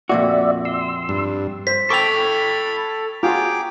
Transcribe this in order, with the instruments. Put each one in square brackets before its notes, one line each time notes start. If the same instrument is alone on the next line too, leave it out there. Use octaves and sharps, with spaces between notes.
[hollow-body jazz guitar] F2 A#2 F#4 [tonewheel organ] D5 E5
[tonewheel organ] C6 E6
[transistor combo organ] G2
[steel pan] C5 [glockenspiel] B6
[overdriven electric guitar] A4 G5 [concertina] B5 [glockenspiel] C#6 F7 [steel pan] D6
[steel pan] F4 F#4 [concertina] G#4 G5 D6 [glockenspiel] A#5